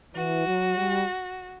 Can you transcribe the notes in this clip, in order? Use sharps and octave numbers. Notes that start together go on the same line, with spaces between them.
E3 F#4
F#3
G3